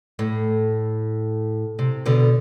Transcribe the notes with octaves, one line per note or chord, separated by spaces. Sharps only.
A2
C3
B2 D3